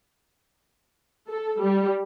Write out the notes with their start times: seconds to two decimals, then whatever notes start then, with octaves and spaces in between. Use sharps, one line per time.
1.31 A4
1.62 G3